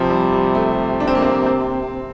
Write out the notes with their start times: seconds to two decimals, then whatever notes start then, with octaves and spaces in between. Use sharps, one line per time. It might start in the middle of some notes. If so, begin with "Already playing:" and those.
Already playing: C3 F3
0.10 G3
0.32 G3
0.55 A3
1.00 D4
1.07 C4
1.15 A#3
1.22 C4
1.46 C4